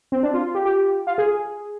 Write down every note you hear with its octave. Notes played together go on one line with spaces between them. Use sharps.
C4
D4
F4
G4
G4
F4
G#4